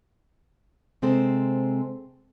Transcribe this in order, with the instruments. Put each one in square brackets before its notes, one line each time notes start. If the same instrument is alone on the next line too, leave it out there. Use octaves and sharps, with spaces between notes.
[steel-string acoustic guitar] C3 G#3 C4 A4 C5